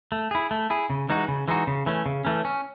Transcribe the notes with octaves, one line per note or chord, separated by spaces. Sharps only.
A3
E4 G#4
A3
E4 G#4
C#3
E3 G#3 D#4 F#4
C#3
E3 G#3 D#4 F#4
C#3
E3 A3 C#4
C#3
E3 A3 C#4
C#4